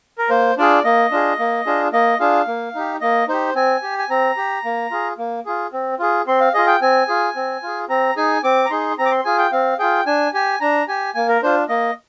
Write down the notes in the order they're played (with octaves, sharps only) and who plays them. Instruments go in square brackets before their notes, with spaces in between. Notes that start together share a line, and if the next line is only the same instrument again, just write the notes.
[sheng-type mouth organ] A#4
A#3 C5
D4 F4 G#4 D5
A#3 D#5
D4 F4 G#4
A#3
D4 F4 G#4
A#3 D#5
D4 F4 G#4 F5
A#3
D#4 G4
A#3 D#5
D#4 G4 C5
C4 G#5
G4
G#5
C4 A#5
G4
A#3
F4 G#4
A#3
F4 G#4
C4
F4 G#4
C4 C6
F5
F4 G#4 D#5
G5
C4 G#5
F4 G#4
C4
F4 G#4
C4 A#5
D#4 G#4 G#5
C4 D6
A#5
D#4 G#4 C6
C4 A#5
D6
C6
F4 G#4 G#5
G5
C4 F5
F4 G#4 G5
D4 G#5
G4 G#5
D4 A#5
G4 G#5
A#3 G#5
A#4
D4 F4 C5
A#3 D#5